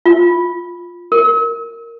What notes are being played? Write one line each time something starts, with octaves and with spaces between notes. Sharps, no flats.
F4
A#4